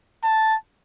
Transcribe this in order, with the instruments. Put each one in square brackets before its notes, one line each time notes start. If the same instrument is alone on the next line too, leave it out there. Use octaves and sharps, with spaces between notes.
[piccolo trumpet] A5